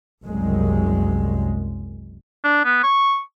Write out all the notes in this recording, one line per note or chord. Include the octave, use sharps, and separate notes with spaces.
F#1 C2 F#2 G#3
D4
B3
C#6